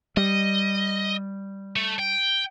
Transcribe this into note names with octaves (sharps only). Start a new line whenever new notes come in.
G3 D#5
A3
G5